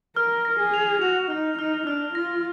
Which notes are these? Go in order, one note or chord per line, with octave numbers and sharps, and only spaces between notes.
A#4 F6
A#6
G#4
F7
F#4 F7
D#4 F6
D#4 F6
D4 F6
F4 A#6